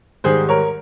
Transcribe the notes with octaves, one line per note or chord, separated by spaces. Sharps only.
G#2 D#3 G3 G#4 C5
A#4 C#5